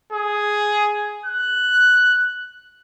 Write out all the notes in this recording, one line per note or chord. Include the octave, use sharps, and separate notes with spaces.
G#4
F#6